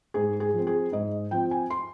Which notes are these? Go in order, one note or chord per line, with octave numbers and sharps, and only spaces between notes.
G#2 G#4
G#4
F3 C4
G#4
G#2 D#5
F3 C4 G5
G#5
C6